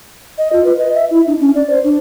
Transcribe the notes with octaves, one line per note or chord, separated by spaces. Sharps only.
D#5
F4
B4
D#5
E5
E4
D4
C#4
D5
C5
D4